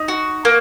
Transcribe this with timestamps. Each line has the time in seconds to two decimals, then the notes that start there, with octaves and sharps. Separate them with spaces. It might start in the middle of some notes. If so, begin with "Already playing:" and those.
Already playing: D#4
0.08 F#4
0.45 A#3